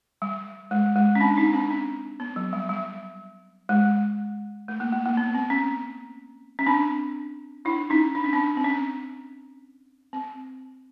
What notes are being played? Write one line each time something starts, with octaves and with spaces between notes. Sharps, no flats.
G3
G#3
G#3
C#4
C4 D4
C#4 D#4
C4 D4
C#4
B3
F#3
G3
G3
G#3
A3
A#3
A#3
A#3
B3
C4
C#4
C#4
C4 D4
D4 E4
C#4 D#4
D4
C#4
C4 D4
C4
C#4
C4